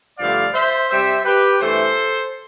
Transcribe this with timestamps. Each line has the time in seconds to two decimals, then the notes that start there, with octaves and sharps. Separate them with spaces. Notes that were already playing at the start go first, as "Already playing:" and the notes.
0.19 G2 D3 F3 A3 D5 F5
0.54 C5 E5
0.89 C3 G3 C5 E5
1.25 G4 B4
1.60 G2 E3 A3 A4 C5